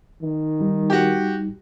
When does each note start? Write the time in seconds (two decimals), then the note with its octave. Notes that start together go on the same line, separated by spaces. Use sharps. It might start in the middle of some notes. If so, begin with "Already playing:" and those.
0.22 D#3
0.61 G3 D#4
0.90 F#4 G4